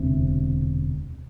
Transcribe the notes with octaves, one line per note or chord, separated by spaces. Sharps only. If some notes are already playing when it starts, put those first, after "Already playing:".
Already playing: E1 D2 C3